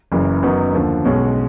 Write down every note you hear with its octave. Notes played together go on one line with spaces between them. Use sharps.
F#1 F#2 C#3 E3
F#2 D#3 F#3 B3 D#4
D#2 D3 F3
B1 B2 G#3 C#4